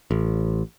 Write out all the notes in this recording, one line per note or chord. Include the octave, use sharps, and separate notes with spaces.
A1